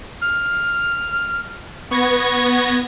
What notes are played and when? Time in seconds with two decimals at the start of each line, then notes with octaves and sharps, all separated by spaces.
0.22 F6
1.91 B3 C#6 G#6 A#6